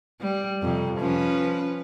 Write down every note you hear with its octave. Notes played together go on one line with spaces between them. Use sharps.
G3
F2 C3
F3 C#4 B4